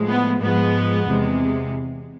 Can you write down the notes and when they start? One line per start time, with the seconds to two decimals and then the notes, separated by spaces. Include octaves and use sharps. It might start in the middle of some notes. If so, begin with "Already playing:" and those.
Already playing: A2 F3 G#3
0.08 B3
0.41 G#2 F3 G#3 B3
1.07 E2 C3 G#3